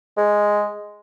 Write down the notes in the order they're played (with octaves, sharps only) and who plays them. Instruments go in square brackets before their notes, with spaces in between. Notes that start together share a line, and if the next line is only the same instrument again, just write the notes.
[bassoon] G#3